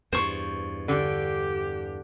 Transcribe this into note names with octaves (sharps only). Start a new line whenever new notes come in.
E2 G2 C5 C#6
D3 G4